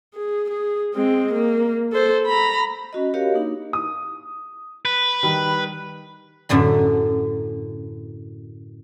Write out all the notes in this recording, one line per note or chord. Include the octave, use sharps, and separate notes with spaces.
G#4
G#4
G#3 C4
A#3
A4 C5
A#5 B5
C#4 F#4 D#5
F#4 G4 A#4 C#5 D#5 F5
A#3 D4 D#4
D#6
B4
D#3 G3 B5
F#2 A2 D3 B5